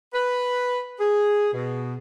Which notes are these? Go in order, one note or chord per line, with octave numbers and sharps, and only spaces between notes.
B4
G#4
B2